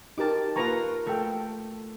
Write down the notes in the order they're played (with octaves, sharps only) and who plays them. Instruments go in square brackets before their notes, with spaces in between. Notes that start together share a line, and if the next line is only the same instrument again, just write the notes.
[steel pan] D#4 G4 A#4 [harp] A5 D6
[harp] A#3 F4 [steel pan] B4 A#5 C#6
[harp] A3 [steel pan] A4 G5